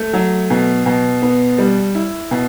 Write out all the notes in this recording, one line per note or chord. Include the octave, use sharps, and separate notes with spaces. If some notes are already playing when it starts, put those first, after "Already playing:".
Already playing: A3
F#3
B2
B2
B3
G3
E4
B2